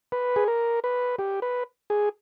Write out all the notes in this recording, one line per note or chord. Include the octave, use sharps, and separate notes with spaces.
B4
G#4
A#4
B4
G4
B4
G#4